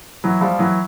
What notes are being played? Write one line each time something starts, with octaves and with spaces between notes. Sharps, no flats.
E3 F#3
F3 G3
E3 F#3